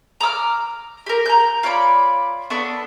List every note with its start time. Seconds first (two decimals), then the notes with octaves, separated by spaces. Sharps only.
0.21 A#5 D6 E6 F6
1.06 G4 A#4
1.26 A#5 G6
1.63 F4 C#5 D5 B5
2.50 B3 D4 A4 C#6